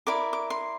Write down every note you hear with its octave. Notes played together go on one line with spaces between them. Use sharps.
E4 A#4 D5 D6
D6
C6